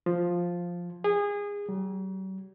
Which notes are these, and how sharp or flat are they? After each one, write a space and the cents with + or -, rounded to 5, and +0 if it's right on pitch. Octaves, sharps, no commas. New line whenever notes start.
F3 +5
G#4 -25
F#3 +45